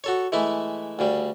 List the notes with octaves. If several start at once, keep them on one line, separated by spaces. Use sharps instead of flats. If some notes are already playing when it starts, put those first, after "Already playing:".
F#4 A4 C#5
E3 G#3 A3 E4
D2 C#3 G3